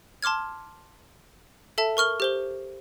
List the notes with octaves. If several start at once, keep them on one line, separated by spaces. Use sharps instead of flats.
A5 C6 D6 F6 G#6
A4 E5 A5
A#4 C#6 F6 G7
G4 C5 G7